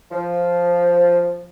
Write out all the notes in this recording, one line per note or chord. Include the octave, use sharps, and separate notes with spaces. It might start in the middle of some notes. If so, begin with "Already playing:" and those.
F3